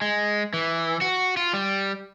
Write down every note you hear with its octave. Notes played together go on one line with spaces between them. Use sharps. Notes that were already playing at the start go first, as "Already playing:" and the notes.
G#3
E3
F#4
F4
G3